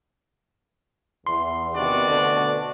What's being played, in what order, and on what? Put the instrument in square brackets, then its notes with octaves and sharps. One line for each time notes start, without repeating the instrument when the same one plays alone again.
[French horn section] E2 [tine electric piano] C6
[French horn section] C3 D#3 B3 [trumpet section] D4 F#4 D5
[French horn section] D2 B2 D3